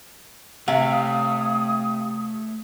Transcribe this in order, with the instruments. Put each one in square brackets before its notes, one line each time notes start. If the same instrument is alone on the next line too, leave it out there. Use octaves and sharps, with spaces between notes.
[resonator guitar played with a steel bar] C3 [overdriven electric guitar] A3 C#5 [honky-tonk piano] F5
[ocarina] D#6